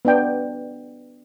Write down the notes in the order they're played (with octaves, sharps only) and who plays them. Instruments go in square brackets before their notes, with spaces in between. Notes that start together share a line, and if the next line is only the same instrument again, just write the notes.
[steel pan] B3 D4 G5